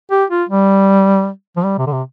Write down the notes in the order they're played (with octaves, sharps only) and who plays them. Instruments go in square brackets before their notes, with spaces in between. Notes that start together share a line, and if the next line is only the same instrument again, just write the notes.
[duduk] G4
F4
G3
F3
G3
C3
D3
C3